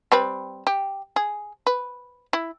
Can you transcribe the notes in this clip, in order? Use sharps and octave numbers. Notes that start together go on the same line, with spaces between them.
G3 C4 B4
G4
G#4
B4
E4